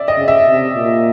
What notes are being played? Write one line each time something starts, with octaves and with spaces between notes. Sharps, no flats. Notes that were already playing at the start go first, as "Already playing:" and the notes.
Already playing: D5 E5
D#5
C#3
E5
C3
A#2